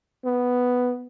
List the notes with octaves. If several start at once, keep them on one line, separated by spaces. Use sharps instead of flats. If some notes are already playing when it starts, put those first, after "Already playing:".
B3